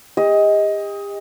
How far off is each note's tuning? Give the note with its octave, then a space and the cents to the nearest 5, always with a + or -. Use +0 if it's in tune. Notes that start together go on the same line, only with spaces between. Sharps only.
G4 +45 D#5 +15